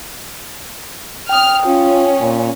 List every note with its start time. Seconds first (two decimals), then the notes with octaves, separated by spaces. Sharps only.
1.29 G5 D#6 F6
1.66 C#4 F4
2.21 A#2